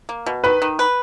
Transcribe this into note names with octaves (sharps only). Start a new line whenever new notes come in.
A#3
B2
D#3 B4
D#3
B4